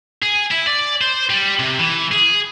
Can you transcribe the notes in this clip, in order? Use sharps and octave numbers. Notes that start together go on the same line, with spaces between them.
G#4
E4
D5
C5
G3
C3
E3
G#4